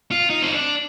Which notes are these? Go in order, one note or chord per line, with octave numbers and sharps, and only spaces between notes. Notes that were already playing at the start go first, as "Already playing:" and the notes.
F4
D#4
C4
D4